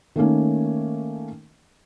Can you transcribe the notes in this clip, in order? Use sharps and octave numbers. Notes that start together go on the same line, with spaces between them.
D#3 A3 A#3 C#4